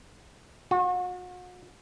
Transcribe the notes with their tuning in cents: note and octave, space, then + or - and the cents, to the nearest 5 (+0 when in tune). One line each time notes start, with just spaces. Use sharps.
F#4 -40